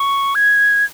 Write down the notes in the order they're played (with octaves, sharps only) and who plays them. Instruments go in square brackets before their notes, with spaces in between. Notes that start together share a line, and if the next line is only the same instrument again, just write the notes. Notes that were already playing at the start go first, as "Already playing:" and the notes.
Already playing: [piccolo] C#6
G#6